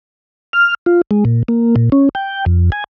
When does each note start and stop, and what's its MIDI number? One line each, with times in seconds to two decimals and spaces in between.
0.53 0.75 89
0.86 1.01 65
1.11 1.24 56
1.25 1.43 46
1.48 1.75 58
1.76 1.90 46
1.92 2.09 61
2.15 2.45 79
2.46 2.70 41
2.72 2.84 80